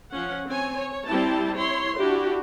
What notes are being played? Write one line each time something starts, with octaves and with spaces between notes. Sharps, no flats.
F3 C#4 F#5
C4 C#5 G#5
C#5
G3 C4 E4 G4 A5
E4 C#5 C6
D4 E4 F#4 G4